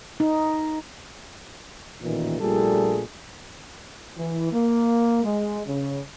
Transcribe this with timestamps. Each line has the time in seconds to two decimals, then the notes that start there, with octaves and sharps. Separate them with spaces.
0.20 D#4
2.02 A1 A#2 D#3 E3
2.41 A#1 A#2 G3 A3 G#4 A4
4.17 E3
4.53 A#3
5.24 G#3
5.67 C#3